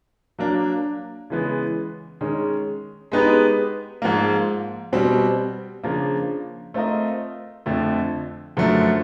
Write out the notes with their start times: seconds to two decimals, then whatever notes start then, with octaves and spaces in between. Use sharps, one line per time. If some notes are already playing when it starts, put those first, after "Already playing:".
0.39 F#3 A#3 D4
1.30 C#3 E3 G#3 B3
2.21 D#3 G#3 C#4
3.12 G#3 B3 D#4 G4 B4
4.02 G#2 F3 A#3
4.93 B2 G3 C4
5.83 C#3 F3 A#3 D4
6.74 A3 C4 F4 A#4 D#5
7.66 F2 D3 F3 A3
8.57 F#2 D3 F3 A3